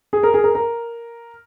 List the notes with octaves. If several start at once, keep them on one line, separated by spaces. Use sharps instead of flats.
G#4
A#4
G#4
A#4
A#4